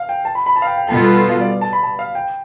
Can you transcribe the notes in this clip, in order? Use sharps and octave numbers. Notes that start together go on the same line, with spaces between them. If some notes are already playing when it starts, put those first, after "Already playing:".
Already playing: F5
G5
A5
B5
B5
A5
F5
G5
G5
B2 G3 B3 F4 A4 A5
B5
F5
D5
D5
A5
B5
A5
F5
G5